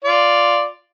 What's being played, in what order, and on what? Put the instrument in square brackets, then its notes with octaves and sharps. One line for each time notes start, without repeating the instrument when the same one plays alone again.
[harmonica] F4 D5